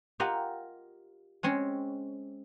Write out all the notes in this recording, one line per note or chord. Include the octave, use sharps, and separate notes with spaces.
F4 G4 A#4 D#5 F#5 A#5
G#3 C4 C#4 C#5